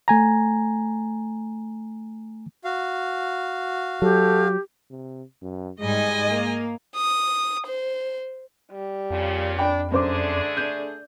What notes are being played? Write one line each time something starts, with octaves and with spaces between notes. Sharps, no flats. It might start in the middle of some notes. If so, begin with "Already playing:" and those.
A3 G#5 A#5
F#4 F5
F#3 G4 A4
C3
F#2
G#2 G3 G#3 D#5 G#5
A#3
D#6
C5
G3
F2 A#2 C#3 F4
D4 G5 B5
F#2 D3 A3 D4 G#4 C5 D6
G6